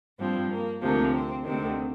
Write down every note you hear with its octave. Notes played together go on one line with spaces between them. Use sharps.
G2 F3 C4
A#3
D2 C3 F3 A#3
C4
D2 C3 D#3 C4